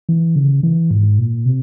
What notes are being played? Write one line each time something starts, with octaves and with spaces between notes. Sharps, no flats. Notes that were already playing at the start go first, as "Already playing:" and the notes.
E3
C#3
E3
G#2
A#2
C3